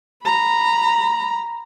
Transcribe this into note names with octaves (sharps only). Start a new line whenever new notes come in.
A#5 B5